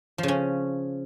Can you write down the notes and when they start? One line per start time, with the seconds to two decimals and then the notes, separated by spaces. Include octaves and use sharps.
0.18 F3
0.23 C#3
0.28 C#4